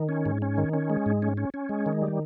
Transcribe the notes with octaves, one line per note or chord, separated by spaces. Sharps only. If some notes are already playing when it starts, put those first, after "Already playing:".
Already playing: D#3
C#4
G#2
C#4
D#3
C#4
G#3
G#2
C#4
C#4
C#4
G#3
D#3
G3